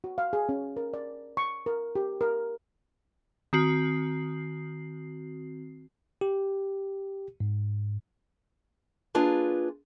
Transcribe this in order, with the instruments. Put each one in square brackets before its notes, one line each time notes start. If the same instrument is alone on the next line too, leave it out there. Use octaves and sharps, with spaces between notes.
[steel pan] F#4
F5
G#4
C#4
A#4
D5
C#6
A#4
G4
A#4
[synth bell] D#3 C4 F#4 C7
[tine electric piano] G4
G#2
[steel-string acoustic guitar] A#3 D4 F4 G#4 B4